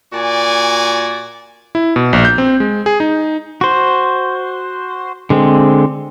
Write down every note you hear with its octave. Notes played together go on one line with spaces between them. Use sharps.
A#2 F#4 D5 G#5
E4
B2
A#1
G6
C4
G#3
G#4
D#4
F#4 C5
D3 G#3 C4